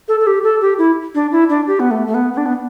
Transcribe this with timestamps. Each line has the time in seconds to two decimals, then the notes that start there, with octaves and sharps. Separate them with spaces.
0.08 A4
0.20 A4
0.27 G4
0.44 A4
0.61 G4
0.79 E4
1.15 D4
1.32 E4
1.49 D4
1.67 G4
1.80 B3
1.91 A3
2.07 A3
2.14 B3
2.33 B3
2.37 D4
2.46 B3